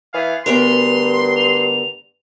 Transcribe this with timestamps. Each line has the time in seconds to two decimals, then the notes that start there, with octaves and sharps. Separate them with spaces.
0.14 E3 B3 G#4 F5
0.46 D2 G2 B3 A#4 C6 F7
1.36 F7